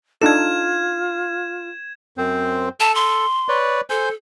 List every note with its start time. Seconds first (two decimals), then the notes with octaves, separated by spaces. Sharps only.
0.22 D4 D#4 F4 A4 G#6 E7
2.18 F#2 C4 C5
2.80 A4 A5
2.95 C6
3.49 B4 C#5 D5
3.90 A4 C5 G#5 G6